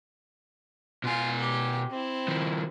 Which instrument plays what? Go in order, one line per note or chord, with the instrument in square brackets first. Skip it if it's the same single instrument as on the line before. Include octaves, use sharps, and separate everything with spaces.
[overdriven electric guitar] B2 G#5 [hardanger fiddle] F4 F5
[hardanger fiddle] G4 G5
C4 E4
[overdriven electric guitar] D#3 F3